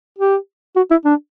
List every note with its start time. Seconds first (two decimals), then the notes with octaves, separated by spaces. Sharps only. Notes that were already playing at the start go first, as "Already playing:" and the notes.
0.18 G4
0.76 F#4
0.91 E4
1.05 D4